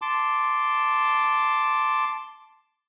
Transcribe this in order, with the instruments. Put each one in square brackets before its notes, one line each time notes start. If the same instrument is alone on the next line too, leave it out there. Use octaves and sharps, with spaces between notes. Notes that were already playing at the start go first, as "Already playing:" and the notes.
[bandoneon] A5 C6 D6